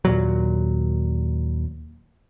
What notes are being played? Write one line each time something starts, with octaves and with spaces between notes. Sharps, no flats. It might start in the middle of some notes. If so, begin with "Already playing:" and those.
D#2 A#2 F#3